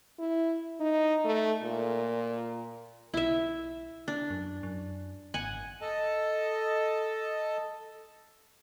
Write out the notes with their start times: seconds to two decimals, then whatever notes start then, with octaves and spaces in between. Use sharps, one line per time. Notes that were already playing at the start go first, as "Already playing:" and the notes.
0.18 E4
0.80 D#4
1.24 A3
1.63 A#2
3.14 B1 E4 E5
4.08 D4
4.30 F#2
4.63 F#2
5.34 G#1 F#5 G#5
5.81 A4 D#5 A5